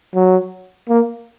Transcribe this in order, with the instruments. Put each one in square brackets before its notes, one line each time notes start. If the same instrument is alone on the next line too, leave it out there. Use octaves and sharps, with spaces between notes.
[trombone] F#3
A#3